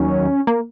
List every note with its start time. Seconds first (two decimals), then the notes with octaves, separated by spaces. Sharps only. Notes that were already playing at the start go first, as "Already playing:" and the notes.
Already playing: D#2 D#3 F#3 C#4
0.47 A#3